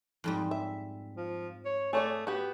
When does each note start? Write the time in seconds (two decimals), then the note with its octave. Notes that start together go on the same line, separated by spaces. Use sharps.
0.24 F2 G#2 G3
0.51 E5
1.17 F3
1.65 C#5
1.93 A3 G#4 C#5 D5
2.27 B3 F#4 G4